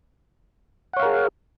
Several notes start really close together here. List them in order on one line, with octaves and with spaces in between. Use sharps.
F#5 C#5 F5 A#4 G#4